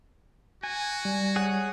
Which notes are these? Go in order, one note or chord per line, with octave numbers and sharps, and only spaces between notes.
F#4 G#5
G3
G#4 C#5 F#5